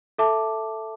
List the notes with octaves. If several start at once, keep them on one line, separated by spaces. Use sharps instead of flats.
A4 E5 A5 D6